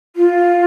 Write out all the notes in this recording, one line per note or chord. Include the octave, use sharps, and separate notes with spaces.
F4